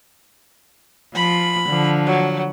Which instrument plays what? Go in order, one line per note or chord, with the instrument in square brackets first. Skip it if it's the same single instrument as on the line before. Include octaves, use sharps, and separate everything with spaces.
[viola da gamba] F3 [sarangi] B5
[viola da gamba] D3 F3
[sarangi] F#3